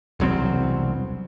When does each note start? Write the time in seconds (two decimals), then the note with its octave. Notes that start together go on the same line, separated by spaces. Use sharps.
0.20 E1 C2 F#3 C4